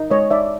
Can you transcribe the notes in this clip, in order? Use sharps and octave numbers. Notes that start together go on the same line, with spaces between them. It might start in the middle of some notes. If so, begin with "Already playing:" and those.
Already playing: D#4
G#3 C#5 D#5
D#4 D5 E5